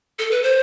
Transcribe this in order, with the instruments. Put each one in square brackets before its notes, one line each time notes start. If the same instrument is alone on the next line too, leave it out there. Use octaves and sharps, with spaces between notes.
[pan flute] A4
B4
C5